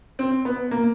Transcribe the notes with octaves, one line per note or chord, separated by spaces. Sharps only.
C4
B3
A#3